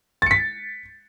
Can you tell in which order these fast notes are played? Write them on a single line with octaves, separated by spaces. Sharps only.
A6 C#7 B6